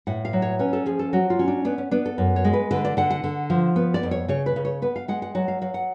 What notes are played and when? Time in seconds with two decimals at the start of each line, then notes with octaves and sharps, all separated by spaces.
0.07 A2 F#5
0.25 F5
0.33 F#3
0.42 C#5
0.59 C#4 B4
0.73 A4
0.86 F3 G#4
0.99 A4
1.13 F#3 F#4
1.30 F4
1.39 C#4
1.48 D4
1.65 B3 D4
1.78 C#4
1.91 B3 D4
2.05 A4
2.18 F#2
2.36 C#5
2.45 G#3
2.53 B4
2.71 D3 B4
2.85 D5
2.97 D3 F#5
3.10 F#5
3.24 D3
3.50 F3
3.76 B3
3.94 D5
4.03 F2
4.11 C#5
4.28 C#3 C#5
4.46 B4
4.56 C#3
4.65 C#5
4.82 B3 B4
4.96 F5
5.08 G#3 F#5
5.22 F#5
5.35 F#3 F#5
5.48 F5
5.62 F#3 F5
5.74 F#5